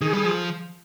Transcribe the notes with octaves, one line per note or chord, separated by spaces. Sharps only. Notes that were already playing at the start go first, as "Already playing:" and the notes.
D#3 G#4
G3 G#4
F3